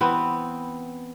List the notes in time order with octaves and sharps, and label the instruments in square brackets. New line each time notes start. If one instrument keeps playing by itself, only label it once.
[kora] E3 B3 C4